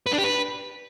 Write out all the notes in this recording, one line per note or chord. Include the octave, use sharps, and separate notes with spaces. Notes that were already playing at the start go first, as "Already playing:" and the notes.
B4
D4
G4
B4